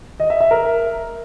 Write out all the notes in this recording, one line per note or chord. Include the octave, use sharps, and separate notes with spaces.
D#5
E5
E5
A#4